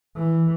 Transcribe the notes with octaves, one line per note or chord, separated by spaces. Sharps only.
E3